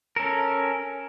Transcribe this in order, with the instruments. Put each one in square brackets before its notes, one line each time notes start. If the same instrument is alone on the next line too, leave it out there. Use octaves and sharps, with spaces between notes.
[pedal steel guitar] C#4 A4 A#4